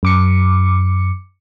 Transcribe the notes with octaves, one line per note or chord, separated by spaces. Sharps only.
F#2 D6 C#7